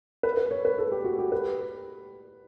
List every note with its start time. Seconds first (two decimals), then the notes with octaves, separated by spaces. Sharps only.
0.23 B4
0.37 B4
0.51 C#5
0.65 B4
0.78 A4
0.92 G4
1.05 F#4
1.19 G4
1.32 B4